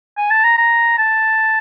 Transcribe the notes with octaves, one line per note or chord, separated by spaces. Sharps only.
G#5
A5
A#5
A#5
A5